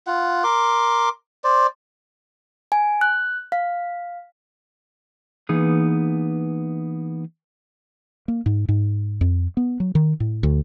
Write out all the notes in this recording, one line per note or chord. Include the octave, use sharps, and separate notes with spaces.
F4 F#5
A#4 C6 D6
C5 D5
G#5
F#6
F5
E3 A#3 B3 D#4 G#4
A#3
G#2
G#2
F2
B3
F#3
D#3
A2
D2